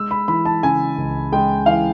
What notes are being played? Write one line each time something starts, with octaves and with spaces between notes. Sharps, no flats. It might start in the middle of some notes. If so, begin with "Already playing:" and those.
Already playing: G#3 E6
B5
E3 B5
A5
C#3 G#5
C#2
G#3 G5
E3 F5